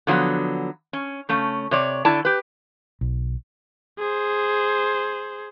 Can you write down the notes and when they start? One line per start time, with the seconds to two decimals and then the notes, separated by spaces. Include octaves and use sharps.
0.07 D3 F3 F#3 A#3 B3
0.93 C#4
1.29 C#3 A3 C#4
1.71 C3 C#5 D5
2.05 D3 E4 D5 A5
2.25 G4 B4
3.01 B1
3.99 G#4 C5